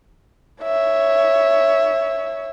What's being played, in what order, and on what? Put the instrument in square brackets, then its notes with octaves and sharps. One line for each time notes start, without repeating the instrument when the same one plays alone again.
[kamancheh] C#5 E5